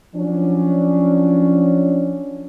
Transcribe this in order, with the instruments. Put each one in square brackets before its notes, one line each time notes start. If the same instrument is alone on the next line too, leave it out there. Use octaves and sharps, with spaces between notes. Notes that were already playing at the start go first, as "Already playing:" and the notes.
[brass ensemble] F3 F#3 C#4 D4